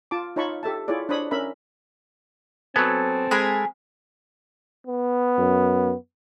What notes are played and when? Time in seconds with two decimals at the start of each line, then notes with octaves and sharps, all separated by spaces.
0.11 F4 A5 D6
0.36 D#4 F4 C#5 A5 B5 C#6
0.63 G4 A4 E5 A5
0.88 E4 F4 G#4 C#5 D5
1.09 D4 C5 C#5 B5 D#6
1.31 C#4 A#4 E5 B5
2.76 F#3 B3 C4 A4 G#5
3.31 G#3 G#4 A#4 B5
4.87 B3
5.38 F#2